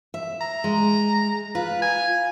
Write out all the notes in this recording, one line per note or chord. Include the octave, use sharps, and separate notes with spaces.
E5
A#5
G#3
F4 B4
G#5